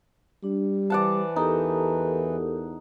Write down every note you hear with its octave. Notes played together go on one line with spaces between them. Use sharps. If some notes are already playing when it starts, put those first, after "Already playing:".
G3 D4
E3 C5 D5 F#5 A5
E2 D#4 G4 A4 A#4